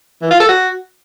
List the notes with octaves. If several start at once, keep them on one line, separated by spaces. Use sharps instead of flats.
E3
F4
A4
F#4